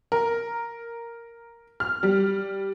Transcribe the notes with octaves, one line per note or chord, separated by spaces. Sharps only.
A#4
F6
G3